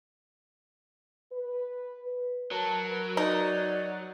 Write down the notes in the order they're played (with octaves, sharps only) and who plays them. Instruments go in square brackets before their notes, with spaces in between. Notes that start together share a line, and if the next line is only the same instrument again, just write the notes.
[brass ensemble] B4
[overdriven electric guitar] F#3 [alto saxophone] A#4 [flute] A5
[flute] B4
[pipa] D#4 [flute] D5